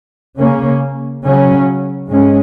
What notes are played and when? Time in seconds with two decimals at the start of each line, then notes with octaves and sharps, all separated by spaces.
0.39 C#3 A#3 C#4
1.24 C#3 F#3 C#4
2.09 G#2 G#3 C#4